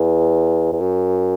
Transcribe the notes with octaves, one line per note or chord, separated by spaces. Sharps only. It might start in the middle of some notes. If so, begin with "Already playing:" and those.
Already playing: E2
E2
F#2